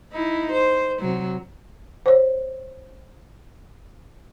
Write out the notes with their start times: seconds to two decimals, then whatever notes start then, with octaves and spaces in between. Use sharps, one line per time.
0.12 D#4 E4
0.52 C5
1.00 C3 F#3
2.06 C5 C#5